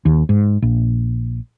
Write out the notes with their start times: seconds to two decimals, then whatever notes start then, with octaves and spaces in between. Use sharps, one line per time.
0.05 D#2
0.29 G#2
0.62 A#1